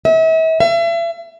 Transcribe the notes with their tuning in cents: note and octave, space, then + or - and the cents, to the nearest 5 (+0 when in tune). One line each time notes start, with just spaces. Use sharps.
E5 -40
E5 +40